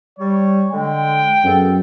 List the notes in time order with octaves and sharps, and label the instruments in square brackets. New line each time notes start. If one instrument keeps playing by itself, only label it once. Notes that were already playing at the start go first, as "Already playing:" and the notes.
[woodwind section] G3 [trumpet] C#5
[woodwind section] D3 G#3 [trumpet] G5
[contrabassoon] F#2 [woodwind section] B3 G#4 A4